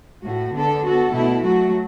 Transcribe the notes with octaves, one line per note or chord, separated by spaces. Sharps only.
A2 A3 F#4
D3 B3 D4 A4
B3 F#4 A4
B2 A3 E4
F#3 A3 F#4